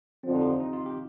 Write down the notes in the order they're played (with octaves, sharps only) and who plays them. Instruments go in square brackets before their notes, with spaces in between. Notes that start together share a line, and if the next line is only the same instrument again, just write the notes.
[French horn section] F2 D3 F3 [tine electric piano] C4
[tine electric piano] D#4
G4
F4
D#4
F4
G4